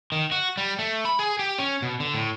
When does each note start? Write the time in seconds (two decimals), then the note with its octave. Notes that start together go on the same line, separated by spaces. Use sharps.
0.12 D#3
0.32 F#4
0.57 G3
0.79 A3
1.05 B5
1.19 G#4
1.39 G4
1.58 C#4
1.82 B2
2.00 D3
2.14 A2